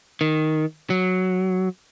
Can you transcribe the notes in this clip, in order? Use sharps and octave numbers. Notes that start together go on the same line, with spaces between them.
D#3
F#3